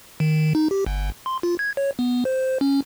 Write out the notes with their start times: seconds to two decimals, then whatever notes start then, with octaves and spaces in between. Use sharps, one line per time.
0.20 D#3
0.55 D#4
0.71 G4
0.86 G1
1.26 C6
1.43 F4
1.59 G#6
1.77 C#5
1.99 B3
2.25 C5
2.61 C#4